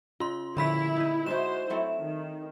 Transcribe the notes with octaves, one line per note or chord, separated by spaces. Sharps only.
C#3 F4 C6
A#2 D3 F3 A3 E4 B5 B6
D#4 D#5
G#3 D#4 E4 F#4 C5 E7
F#3 A3 C4 E4
D#3